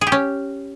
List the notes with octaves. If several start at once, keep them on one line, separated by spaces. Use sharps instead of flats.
G#4
G4
C#4